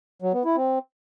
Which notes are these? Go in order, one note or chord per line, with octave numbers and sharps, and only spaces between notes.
F#3
B3
E4
C4